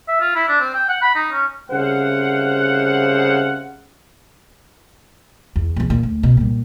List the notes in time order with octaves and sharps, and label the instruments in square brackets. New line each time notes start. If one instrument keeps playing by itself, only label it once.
[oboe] E5
F4
E4
D4
C4
G5
F#5
B5
D#4
C#4
[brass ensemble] C2 C#3 C5 F5 F#5
[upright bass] E2
E2 A#2
A#2
D2
B2
A#2 G3